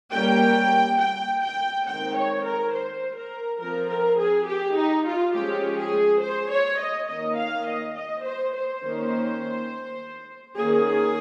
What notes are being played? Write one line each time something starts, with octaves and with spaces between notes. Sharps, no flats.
G3 A#3 C#4 G5
G5
G5
D#3 G#3 C4 G5
C#5
A#4
C5
A#4
F3 C4 A#4
A#4
G#4
G4
D#4
F4
F3 G#3 C#4 G4
G#4
C5
C#5
D#5
D#3 A#3 C#4 D#5
F5
D#5
D#5
C5
C5
D#3 A#3 C#4
D#3 A#3 C#4 G#4